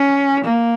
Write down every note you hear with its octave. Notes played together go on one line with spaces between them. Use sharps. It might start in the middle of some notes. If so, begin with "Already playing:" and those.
Already playing: C#4
A#3